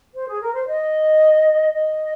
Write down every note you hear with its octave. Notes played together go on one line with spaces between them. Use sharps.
C5
G#4
A#4
C5
D#5
D#5